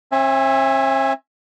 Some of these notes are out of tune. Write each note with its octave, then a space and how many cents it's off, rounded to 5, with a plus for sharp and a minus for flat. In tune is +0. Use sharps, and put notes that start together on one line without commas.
C4 +45 E5 +0 G#5 +0